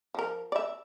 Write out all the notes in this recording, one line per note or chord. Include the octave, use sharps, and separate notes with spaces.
F3 A#4
D5 E5